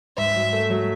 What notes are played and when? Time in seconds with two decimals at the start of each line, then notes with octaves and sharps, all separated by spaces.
0.18 G#2 E5
0.36 F#3
0.53 A3
0.70 F#3